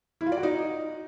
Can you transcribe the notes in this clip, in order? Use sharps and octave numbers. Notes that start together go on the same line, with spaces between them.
E4
F4
D5
F#4
D#4